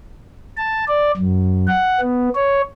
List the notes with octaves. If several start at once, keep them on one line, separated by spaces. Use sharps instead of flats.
A5
D5
F#2
F#5
B3
C#5